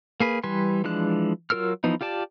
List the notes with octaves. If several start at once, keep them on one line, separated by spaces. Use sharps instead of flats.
A#3 G#4 B4
E3 G3 B4 G#5 C6
E3 F3 G#3 D4 F#6
F#3 F4 A#4 E6 F6
E3 F3 B3 D#4
F4 G4 D5 A5